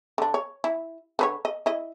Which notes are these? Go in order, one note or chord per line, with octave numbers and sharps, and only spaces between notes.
D3 D4
C#5
E4
D3 B4 C#5
D#5
E4 D#5